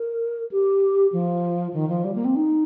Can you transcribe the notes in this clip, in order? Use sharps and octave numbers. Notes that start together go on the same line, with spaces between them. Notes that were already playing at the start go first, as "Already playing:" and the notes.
Already playing: A#4
G4
F3
D#3
F3
G3
A#3
C4
D#4